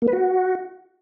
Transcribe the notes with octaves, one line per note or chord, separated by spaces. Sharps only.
A#3
B4
F#4